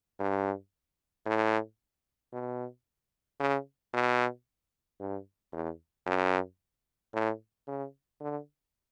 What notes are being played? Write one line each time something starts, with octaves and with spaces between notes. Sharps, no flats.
G2
A2
B2
C#3
B2
G2
E2
F#2
A2
C#3
D3